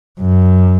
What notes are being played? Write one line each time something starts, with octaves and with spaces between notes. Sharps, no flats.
F#2